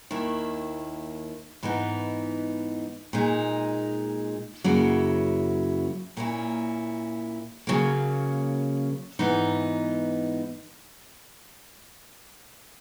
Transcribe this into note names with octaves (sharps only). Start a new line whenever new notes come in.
D#2 D#3 A#3 E4
G#2 E3 B3 D#4
A#2 G#3 D#4
F#2 C#3 F#3 A#3 E4
A#2 A#3 C#4 E4
C#3 F#3 A#3
G#2 E3 B3 D#4